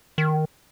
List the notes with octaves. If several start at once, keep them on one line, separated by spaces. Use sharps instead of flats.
D#3